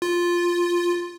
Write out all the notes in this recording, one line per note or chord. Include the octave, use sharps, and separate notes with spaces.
F4